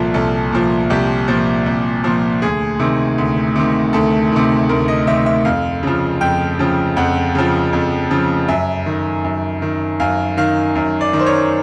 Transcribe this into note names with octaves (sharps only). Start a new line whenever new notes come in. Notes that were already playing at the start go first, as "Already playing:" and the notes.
Already playing: C2 A#2 F3 A4
C2 A4
A#2 F3
C2 G4
A#2 F3
C2
A#2 F3
D2 G#4
C3 D#3
D2
C3 D#3
D2 A4
C3 D#3
D2 A#4
D#5
C3 D#3 E5
E5
F2 F5
C#3 F3
F2 G5
C#3 F3
F2 F#5
C#3 F3
F2
C#3 F3
F#2 E5
D#3
F#2
D#3
F#2 F5
D#3 F5
F#2
D5
D#3
C5
C#5